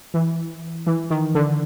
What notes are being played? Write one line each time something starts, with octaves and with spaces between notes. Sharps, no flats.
E3
E3
D#3
D3